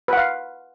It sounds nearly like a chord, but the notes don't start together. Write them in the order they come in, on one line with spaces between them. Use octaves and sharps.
B4 F#5 F5